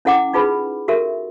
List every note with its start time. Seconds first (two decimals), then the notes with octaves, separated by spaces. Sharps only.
0.05 C#4 E4 A4 F#5 G5 D6
0.34 D#4 F4 G#4 B4 B5
0.88 F#4 G4 A4 A#4 E5